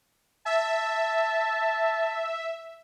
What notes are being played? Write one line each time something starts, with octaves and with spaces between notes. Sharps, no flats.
E5 A5